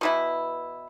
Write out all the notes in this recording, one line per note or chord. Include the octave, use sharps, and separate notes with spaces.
B2 E3 E4